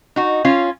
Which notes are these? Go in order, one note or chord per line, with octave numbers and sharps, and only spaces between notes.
D#4 F#4
C#4 F4